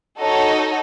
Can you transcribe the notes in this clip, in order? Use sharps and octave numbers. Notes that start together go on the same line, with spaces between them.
D#4 F#4 A4 C#5 D#5